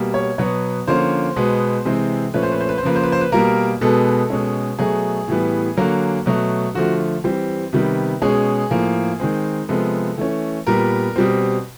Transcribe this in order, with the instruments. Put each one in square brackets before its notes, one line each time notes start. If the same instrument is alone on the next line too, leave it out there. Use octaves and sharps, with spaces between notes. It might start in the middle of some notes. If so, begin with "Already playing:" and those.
Already playing: [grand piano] B2 G3 A#3
C#5
B2 F#3 B3 C#5
D3 F3 A#3 C#4 C5
B2 G#3 B3
C3 E3 G#3 C4
A#2 F3 A3 C#4 B4
C5
B4
C5
B4
C5
C#3 F3 A#3 B4
C5
B4
C5
B4
B2 G3 A#3 A#4
B2 G#3 B3 A4
B2 G#3 C#4
B2 F#3 A3 G#4
A2 E3 G3 B3
D3 F#3 A#3
B2 F#3 A3
D3 F3 A3 F#4
E3 G3 C4
C3 D#3 G3 B3
B2 G#3 C#4 G#4
A2 F3 A#3
D#3 G#3 C4
C3 F3 G#3 B3 A4
E3 A3 C#4
A#2 G3 B3 A#4
B2 G3 C4